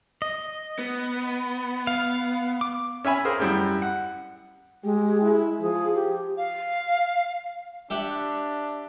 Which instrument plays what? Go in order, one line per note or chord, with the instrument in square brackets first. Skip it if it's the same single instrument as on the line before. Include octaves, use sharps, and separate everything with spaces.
[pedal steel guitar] D#5
[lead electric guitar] B3
[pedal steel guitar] F5
D6
[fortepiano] C#4 E5 G#5 B5
G#4 A#4 C5 F5
F#2 G3 E4
F#5
[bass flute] G#3 [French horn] G4
[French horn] E4
[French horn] F3 [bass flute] G#4
[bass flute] G4
[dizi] F5
[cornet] D4 [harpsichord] G4 E5 F#5